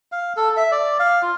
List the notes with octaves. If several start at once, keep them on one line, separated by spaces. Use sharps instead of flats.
F5
A4
E5
D5
F5
F4